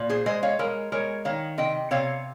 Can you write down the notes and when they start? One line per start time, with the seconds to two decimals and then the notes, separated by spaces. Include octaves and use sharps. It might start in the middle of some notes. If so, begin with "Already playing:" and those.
Already playing: A#2
0.09 G#4 C5
0.26 G#3 C5 D#5
0.43 C#5 F5
0.59 G#3 A#4 C#5
0.92 G#3 A#4 C#5
1.25 D#3 C#5 F5
1.58 C3 D#5 G5
1.91 C3 C#5 F5